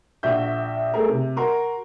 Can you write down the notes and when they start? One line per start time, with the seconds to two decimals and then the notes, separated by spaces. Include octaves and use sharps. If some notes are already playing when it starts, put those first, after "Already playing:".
0.23 A#1 F#4 E5 G6
0.94 A3 G#4 A#4
1.09 C3
1.36 F#4 A#4 C6